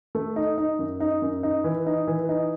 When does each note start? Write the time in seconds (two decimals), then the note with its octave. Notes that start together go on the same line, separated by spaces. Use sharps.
0.15 A3
0.36 D#4
0.58 D#4
0.79 F#2
1.00 D#4
1.22 F#2
1.43 D#4
1.64 E3
1.86 D#4
2.07 E3
2.29 D#4